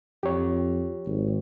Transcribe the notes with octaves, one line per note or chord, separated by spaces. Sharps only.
F2 G4 C#5
G#1